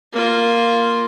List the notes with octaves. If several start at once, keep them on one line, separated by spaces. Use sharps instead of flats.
A#3 F4